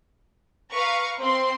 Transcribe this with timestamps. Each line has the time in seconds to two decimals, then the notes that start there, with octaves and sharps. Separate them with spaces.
0.73 B4 F5 A#5 C#6
1.20 C4 C6